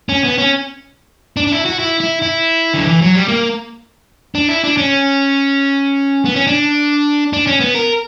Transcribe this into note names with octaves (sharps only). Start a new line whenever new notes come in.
C#4
B3
C#4
D4
D4
E4
F#4
E4
E4
E4
D3
E3
F#3
G3
A#3
D4
E4
D4
C#4
B3
C#4
D4
D4
C#4
B3
A#4